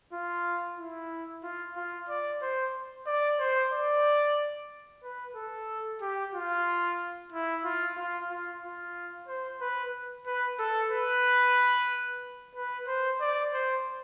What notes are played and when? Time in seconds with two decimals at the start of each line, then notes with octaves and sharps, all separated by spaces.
0.13 F4
0.78 E4
1.43 F4
1.76 F4
2.09 D5
2.42 C5
3.06 D5
3.39 C5
3.72 D5
5.03 B4
5.36 A4
6.01 G4
6.34 F4
7.32 E4
7.64 F4
7.98 F4
8.30 F4
8.63 F4
9.28 C5
9.61 B4
10.26 B4
10.59 A4
10.92 B4
12.55 B4
12.88 C5
13.21 D5
13.53 C5